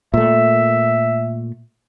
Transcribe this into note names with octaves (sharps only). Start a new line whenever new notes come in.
A#2 A3 E5